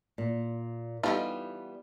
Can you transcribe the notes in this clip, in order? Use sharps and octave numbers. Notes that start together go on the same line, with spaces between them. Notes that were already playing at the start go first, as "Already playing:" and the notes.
A#2
E3 G3 B3 D#4 F4 G4 A4